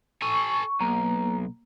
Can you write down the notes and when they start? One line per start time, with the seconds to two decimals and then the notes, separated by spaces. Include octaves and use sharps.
0.22 A4 G#5 C#6
0.81 B1 A#3